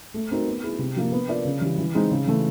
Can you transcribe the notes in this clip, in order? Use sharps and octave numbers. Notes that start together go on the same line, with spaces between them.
A3
C4 D#4 F#4 A#4
B3
E4 G#4
C3
F3 A#3 D4
B3
D4 F4 A#4 D5
C#3
E3 G3
E3
G#3 C4 D#4
C#3
E3 A3